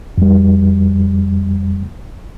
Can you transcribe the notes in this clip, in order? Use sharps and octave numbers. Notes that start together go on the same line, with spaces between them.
F2 G3